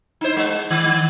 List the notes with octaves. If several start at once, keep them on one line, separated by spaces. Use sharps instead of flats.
D#4 E4 C5
G#3
D#3